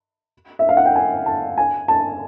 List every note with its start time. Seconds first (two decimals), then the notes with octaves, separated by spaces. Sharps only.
0.59 E5
0.69 F5
0.77 F#5
0.86 G5
0.96 G#5
1.26 A5
1.58 G#5
1.88 A5